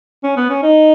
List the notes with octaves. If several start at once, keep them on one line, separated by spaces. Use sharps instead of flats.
C#4
B3
C#4
D#4